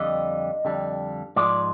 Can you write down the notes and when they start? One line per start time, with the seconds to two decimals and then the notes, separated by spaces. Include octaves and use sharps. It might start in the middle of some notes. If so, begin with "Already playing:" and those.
Already playing: F2 D3 G3 D#5
0.65 F2 D3 G3
1.36 G#2 F3 G#3 D5